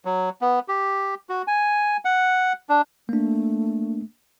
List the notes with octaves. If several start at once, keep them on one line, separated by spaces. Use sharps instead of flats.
F#3
B3
G4
F#4
G#5
F#5
D4
A3 A#3 D4